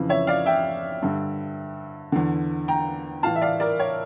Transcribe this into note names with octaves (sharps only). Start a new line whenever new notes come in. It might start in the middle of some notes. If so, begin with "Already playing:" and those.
Already playing: F2 C#3 E3
C#5 E5
D5 F5
E5 G5
G2 D3
E2 D3
G5 A#5
A2 E3 F5 A5
E5
D5 F5
A#4 D5
C#5